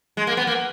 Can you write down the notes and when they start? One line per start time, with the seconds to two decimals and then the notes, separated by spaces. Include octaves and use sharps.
0.17 G#3
0.27 A#3
0.37 B3
0.47 A#3